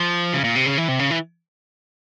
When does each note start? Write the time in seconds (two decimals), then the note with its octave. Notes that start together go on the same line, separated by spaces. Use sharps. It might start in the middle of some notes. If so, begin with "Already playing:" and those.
Already playing: F3
0.34 C#3
0.44 A#2
0.56 C3
0.66 C#3
0.78 E3
0.88 C3
0.99 C#3
1.11 E3